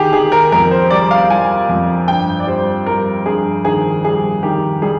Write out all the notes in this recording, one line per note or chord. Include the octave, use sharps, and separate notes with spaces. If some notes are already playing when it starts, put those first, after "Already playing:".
Already playing: D#3 G4 G#4
D#3 G#4
A#4
F2 A#4
C5
G3 D5
F5
G3 G#5
F2
G2 G5
D5
G3 C5
G3 A#4
G2 G#4
D#3 G#4
G3 G#4
D#3 G4
G3 G#4